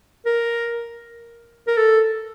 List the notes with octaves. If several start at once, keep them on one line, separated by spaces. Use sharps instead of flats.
A#4
A#4
A4